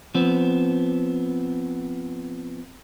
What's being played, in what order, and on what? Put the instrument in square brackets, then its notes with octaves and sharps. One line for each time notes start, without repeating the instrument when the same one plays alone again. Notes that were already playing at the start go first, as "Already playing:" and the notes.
[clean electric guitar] F3 B3 C4